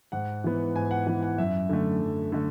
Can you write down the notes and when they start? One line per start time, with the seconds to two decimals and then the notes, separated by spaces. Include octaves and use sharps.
0.12 G#2 F#5
0.44 E3 B3
0.75 G#2 G#5
0.91 F#5
1.07 E3 B3 F#5
1.23 F#5
1.38 F#2 E5
1.69 D3 A3
2.01 F#2
2.32 D3 A3